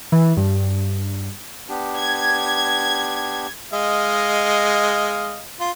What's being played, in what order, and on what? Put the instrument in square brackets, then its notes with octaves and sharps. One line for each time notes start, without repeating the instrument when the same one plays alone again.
[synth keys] E3
G2
[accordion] B3 D4 G4
[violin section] G#6
[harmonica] G#3 D#5 F5
F4